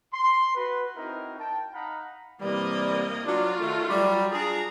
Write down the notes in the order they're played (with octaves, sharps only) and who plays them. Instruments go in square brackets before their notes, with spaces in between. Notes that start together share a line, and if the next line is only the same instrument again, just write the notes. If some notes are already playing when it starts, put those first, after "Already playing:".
[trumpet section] C6
F#4 B4
C4 D#4 E4 F#4 A#4
G5 A5
D#4 F5 F#5 A#5 B5
[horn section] C3 E3 G3 [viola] A#3 D#5
[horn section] F#3 D4 [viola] F4 F#4
[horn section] D#3 A3
F#3 G3
[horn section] D4 F4 G#4 [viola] A#5